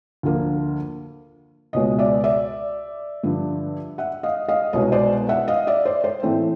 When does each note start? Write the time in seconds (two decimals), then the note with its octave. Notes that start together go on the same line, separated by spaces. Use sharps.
0.23 D2 D3 F3 A#3
1.73 C#2 B2 G#3 C#5 D#5
1.98 D5 E5
2.24 D5 E5
3.23 G2 D3 F3
3.98 E5 F#5
4.23 D#5 F5
4.48 D#5 F5
4.73 C2 B2 G#3 B3 C#5 D#5
4.92 C5 D5
5.29 E5 F#5
5.48 D#5 F5
5.67 D5 E5
5.85 C5 D5
6.04 C5
6.23 A2 E3 A3 C4 C5